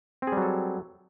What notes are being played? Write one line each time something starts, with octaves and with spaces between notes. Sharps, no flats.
F#3 G3 C4 G#4 A4